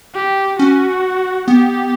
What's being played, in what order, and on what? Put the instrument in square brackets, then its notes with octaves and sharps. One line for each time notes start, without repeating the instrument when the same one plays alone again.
[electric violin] G4
[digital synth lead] C#4 [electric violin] F#4
[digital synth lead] B3 [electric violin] G4